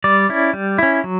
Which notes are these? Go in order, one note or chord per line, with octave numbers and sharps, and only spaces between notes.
G3 D5
C#4 E4
G3
C#4 E4
F#3